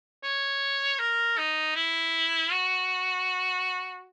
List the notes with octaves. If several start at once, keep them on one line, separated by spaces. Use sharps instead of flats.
C#5
A#4
D#4
E4
F#4